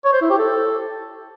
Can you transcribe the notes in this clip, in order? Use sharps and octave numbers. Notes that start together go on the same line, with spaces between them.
C#5
C5
E4
G4
A4